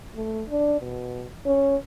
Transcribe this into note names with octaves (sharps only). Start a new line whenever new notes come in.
A3
D4
B2
C#4